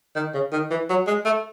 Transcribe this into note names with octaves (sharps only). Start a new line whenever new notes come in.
D#3
C#3
D#3
E3
F#3
G#3
A3